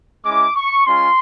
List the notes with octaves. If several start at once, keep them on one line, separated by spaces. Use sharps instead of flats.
G#3 C#4 E4 D6
C#6
G#3 C#4 F4 C6